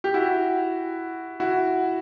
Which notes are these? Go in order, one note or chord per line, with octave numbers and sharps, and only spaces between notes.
G4
E4 F#4
E4 F#4